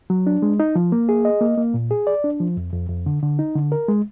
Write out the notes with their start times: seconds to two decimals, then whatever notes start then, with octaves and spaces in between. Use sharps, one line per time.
0.10 F#3
0.27 D4
0.42 G#3
0.60 D#4
0.76 F3
0.92 A#3
1.09 G#4
1.25 D#5
1.41 A#3
1.58 A#3
1.74 A#2
1.91 G#4
2.07 D5
2.24 D4
2.40 F3
2.57 F2
2.73 F2
2.89 F2
3.06 D3
3.22 D3
3.39 D#4
3.55 D3
3.72 A#4
3.88 G#3